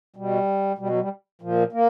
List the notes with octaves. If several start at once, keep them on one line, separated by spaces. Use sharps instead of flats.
B2 G3
B2 G3
F#3
G3
A#2 F3
A#3